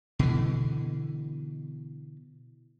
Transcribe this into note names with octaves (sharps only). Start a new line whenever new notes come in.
B2 D3 E3